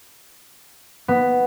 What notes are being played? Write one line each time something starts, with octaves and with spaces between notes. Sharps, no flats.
B3